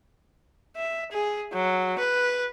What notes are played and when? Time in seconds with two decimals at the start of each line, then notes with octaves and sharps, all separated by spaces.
0.76 E5
1.12 G#4
1.54 F#3
1.99 B4